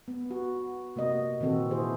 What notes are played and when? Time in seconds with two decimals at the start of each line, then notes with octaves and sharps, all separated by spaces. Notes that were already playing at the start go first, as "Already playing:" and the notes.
0.08 B3
0.31 F#4
0.96 C3 A#3 F#4 D#5
1.40 A#2 D#3 E3 C4 F#4 A4
1.71 E4 G#4 C5